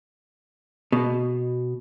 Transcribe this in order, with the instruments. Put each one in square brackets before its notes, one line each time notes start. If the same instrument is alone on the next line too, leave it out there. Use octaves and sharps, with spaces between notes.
[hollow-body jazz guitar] B2